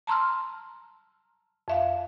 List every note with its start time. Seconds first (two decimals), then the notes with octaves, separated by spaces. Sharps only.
0.07 A5 A#5 C6 E6 F6
1.68 F2 E5 F5